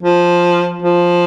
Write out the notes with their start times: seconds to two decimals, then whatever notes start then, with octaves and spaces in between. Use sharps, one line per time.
0.03 F3
0.82 F3